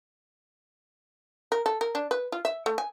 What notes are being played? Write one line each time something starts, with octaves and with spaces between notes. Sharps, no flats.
A#4
A4
A#4
D4
B4
F4
E5
A3
G#5